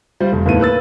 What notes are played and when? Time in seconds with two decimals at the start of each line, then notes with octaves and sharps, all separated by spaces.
0.20 G3 F4 C5
0.32 F1
0.46 D#2 A2 B3 A4 D#7
0.60 A#3 B4 E6 A6